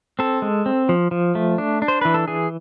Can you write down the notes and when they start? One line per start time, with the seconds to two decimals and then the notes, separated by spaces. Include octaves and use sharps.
0.19 C4 A4
0.42 G#3
0.66 C4
0.89 F3
1.11 F3
1.35 A3
1.58 D4
1.82 D4
1.88 C5
2.01 E3 B4
2.14 A4
2.28 E3 G#4